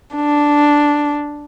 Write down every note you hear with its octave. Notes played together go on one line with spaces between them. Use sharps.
D4